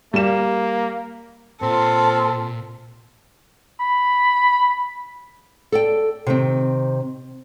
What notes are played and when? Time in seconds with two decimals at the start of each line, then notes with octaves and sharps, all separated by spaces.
0.14 G3 A#3 E7
1.62 A#2 C4 F4 A4
3.80 B5
5.72 A4 D5 G5
6.27 C3 D#3 C4